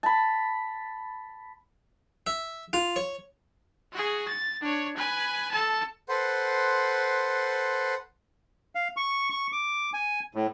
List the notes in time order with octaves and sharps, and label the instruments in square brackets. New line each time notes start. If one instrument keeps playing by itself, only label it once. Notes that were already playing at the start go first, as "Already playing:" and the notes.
[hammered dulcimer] A5 B5
[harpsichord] E5
F4
C#5
[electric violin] F#4 G#4
A6
D4 C#5
B4 G#5
A4 A5
[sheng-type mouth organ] A4 B4 C5 F#5 C6
[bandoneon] F5
C#6
C#6
D6
G#5
A2